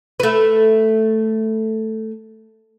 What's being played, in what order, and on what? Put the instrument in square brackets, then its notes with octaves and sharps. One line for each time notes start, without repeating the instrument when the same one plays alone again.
[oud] A3 B4